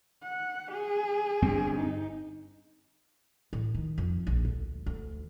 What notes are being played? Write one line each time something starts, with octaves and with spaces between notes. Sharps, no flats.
F#5
G#4
G1 G2 C4
D#4
A1
D#3
F2
A#1
D2
D2